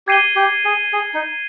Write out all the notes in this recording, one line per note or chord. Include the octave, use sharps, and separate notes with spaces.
G4 G#6 C7 D#7 G7
G4
G#4
G#4
D#4